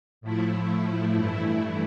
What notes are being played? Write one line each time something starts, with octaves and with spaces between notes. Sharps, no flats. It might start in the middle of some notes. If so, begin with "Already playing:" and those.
A2 F3 A3 E4
G2 E3 A3 E4